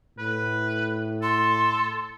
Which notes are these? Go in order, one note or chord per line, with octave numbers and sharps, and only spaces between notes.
A2 B4
A4 C6